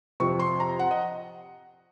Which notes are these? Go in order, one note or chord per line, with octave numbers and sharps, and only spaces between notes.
F2 C3 F3 C4 C#6
C6
A#5
F#5
D#5